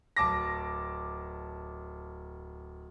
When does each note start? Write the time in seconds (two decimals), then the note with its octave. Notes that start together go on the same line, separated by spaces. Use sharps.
0.16 D1 A5 D6 A#6